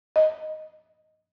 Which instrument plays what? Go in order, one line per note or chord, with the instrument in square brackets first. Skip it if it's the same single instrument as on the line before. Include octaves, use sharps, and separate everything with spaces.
[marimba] D#5